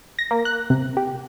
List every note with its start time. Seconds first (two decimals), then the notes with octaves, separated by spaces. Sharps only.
0.19 A#6
0.31 A#3
0.45 F#6
0.70 C3
0.97 G4